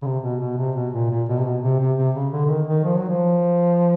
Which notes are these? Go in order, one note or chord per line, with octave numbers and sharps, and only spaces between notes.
C#3
C3
B2
B2
C3
B2
A#2
A#2
B2
C3
B2
C3
C3
C3
C#3
D3
D3
D#3
D#3
F3
F#3
F3